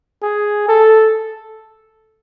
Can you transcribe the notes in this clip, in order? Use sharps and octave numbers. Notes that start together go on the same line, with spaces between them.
G#4
A4